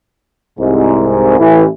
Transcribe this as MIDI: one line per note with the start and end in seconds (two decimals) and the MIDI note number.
0.59 1.37 36
0.59 1.37 44
1.39 1.64 33
1.39 1.64 52